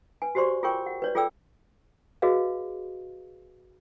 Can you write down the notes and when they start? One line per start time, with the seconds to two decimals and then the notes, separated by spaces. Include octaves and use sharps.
0.22 B4 G#5
0.35 F#4 G4 C5 D5 C6 C#6
0.63 F4 G#4 A#4 C#5 G5 C#6
0.86 F#5
1.02 B4 C#5 D5
1.15 F4 G#4 A4 D5 G5 E6
2.22 F#4 G#4 B4 D#5 F5